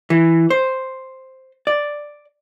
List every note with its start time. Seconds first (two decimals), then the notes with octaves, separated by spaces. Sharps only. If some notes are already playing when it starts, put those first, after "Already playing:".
0.10 E3
0.50 C5
1.67 D5